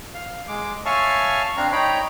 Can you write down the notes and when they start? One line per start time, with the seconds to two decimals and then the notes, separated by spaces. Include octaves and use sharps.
0.14 F5
0.48 G#3 D6
0.86 C#5 E5 F5 G#5 A5 C#6
1.57 C4 D4 F5 A#5
1.72 D#4 C#5 G5 A#5 B5